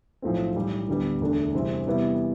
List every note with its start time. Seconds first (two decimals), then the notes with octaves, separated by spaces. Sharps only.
0.22 B1 A2 F3 A3 C4
0.55 B1 A2 E3 G3
0.88 D2 D3 G3 B3
1.20 E1 D2 D3 A3 D4
1.53 E2 C3 G3 C4 E4
1.86 E2 C3 G3 B3 E4